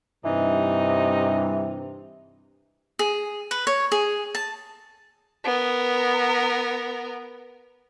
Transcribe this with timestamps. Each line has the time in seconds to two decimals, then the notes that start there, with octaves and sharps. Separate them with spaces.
0.25 G2 C3 E3 D#4
2.99 G#4
3.51 B4
3.67 C#5
3.92 G#4
4.35 A5
5.44 B3 A#4